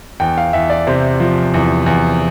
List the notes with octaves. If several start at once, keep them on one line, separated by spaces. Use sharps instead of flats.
E2 G5
F5
E2 E5
D5
C3 C5
F3
E2
E2